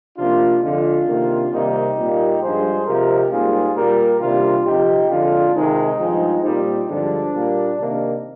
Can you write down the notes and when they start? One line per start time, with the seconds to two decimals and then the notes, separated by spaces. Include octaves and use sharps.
0.17 C3 F3 A#3 D4 F4
0.62 F2 D3 G#3 D4 F4
1.07 C3 D#3 A#3
1.52 C3 D#3 G3 A#3 D#4 G4
1.97 A#2 G3 A#3
2.41 G2 F3 G#3 G#4 C5
2.86 C3 F3 G#3 G4 A#4
3.30 G#2 G3 A#3 F4 G#4
3.75 A#2 G3 A#3 G4 A#4
4.20 C3 D#3 G3 A#3 D4 F4
4.65 F2 C3 F3 D#4 G4
5.09 F2 D3 G#3 D4 F4
5.54 C3 D#3 G#3 C4 D#4
5.99 G2 F3 G#3
6.44 A#2 G3 A#3 C4 D#4
6.89 G2 D3 F3 G#3 D4
7.33 A#2 G3 A#3
7.78 C3 D#3 A#3